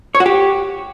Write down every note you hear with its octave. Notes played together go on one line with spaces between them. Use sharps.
C#5
F#4
G4